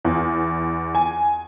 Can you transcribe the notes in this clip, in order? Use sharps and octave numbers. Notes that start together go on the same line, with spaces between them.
E2
G#5